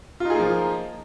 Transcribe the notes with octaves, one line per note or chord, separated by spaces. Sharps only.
F3 A#3 D#4 F4 G#4